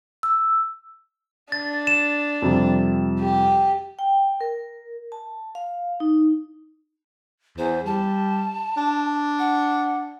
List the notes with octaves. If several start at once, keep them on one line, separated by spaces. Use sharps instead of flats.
E6
D4 A6
E7
F2 C3 G3
G4
G5
A#4
A5
F5
D#4
E2 C5
G3 A5
D4
F#5